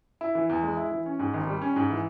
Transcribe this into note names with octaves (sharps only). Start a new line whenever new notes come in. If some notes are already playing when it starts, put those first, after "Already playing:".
E4
E3
E2
G#3
E4
E3
C#4
G#2
G#1
G3
C#4
G#2
E3